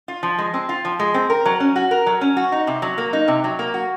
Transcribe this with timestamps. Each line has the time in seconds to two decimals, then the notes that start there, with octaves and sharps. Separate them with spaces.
0.08 F4
0.23 F3
0.38 G#3
0.54 C4
0.69 F4
0.85 F3
1.00 G#3
1.14 C4
1.30 A#4
1.45 F#3
1.60 C#4
1.76 F#4
1.91 A#4
2.06 F#3
2.21 C#4
2.37 F#4
2.52 D#4
2.67 C3
2.82 F#3
2.98 A#3
3.13 D#4
3.28 C3
3.44 F#3
3.59 A#3
3.74 F#4